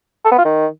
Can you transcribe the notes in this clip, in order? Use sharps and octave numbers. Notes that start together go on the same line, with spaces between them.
A4
B3
F4
D#3